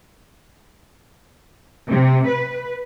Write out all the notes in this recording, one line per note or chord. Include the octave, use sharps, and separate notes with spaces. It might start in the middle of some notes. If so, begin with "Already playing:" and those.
C3
B4